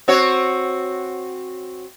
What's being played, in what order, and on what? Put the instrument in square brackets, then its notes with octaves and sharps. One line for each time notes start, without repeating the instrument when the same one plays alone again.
[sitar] C4 F#4 C#5